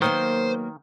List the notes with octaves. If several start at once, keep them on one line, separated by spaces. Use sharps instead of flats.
D#3 F#3 A#3 B3 C5